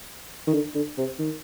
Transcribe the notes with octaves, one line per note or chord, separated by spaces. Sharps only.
D#3
D3
D3
C3
D#3